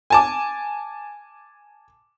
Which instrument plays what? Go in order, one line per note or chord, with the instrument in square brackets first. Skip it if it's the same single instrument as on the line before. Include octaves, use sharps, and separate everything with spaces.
[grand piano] G#5 A5 D6